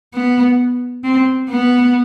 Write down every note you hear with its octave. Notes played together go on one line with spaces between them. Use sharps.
B3
C4
B3